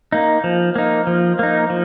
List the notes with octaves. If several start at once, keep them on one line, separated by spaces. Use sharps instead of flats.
A#3 D#4
F3
A#3 D#4
F3
A#3 D#4
F3